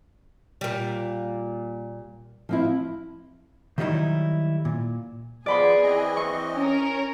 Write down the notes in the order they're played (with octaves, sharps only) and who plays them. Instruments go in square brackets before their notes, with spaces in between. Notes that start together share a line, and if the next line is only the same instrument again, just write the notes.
[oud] A#2 G3
[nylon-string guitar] F3 C4 E4
[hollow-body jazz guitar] D#3 F#3 G3 A3 D#4 E4
A#2
[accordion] F3 B3 [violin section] G#4 [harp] D5 B5 C6
[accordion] E3 C4 D#5
[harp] C#6
[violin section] C#4 A#4